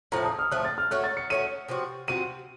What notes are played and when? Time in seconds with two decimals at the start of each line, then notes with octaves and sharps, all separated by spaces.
0.12 A2 F3 A3 A#5
0.25 D#6
0.39 F6
0.51 A2 F3 A3 F#6
0.65 A6
0.78 F6
0.91 A3 C#4 F#4 F#6
1.04 A6
1.17 C#7
1.30 A3 C#4 F#4 D#7
1.68 C3 F3 C4 F#4
2.08 C3 F3 C4 F#4 D#7